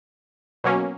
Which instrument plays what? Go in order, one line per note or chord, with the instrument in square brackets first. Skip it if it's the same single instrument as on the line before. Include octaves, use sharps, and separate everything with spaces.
[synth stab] B2 F#3 A#3 C#4